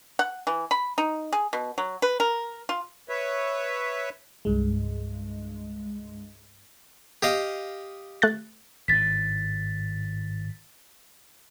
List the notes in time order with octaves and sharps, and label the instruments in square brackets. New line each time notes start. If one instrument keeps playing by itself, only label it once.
[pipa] F#5
E3
B5
D#4
G#4
B2
F#3
B4
A#4
F4
[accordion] B4 C#5 E5
[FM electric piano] C2 G2 G#3
[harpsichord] G4 D#5 F5
[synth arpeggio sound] A3 F#6 A6
[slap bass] G#1 A2 [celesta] A6 B6